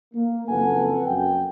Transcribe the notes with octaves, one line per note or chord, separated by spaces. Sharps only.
A#3
F#1 F2 A4 B4 F#5 G#5
F#2 G5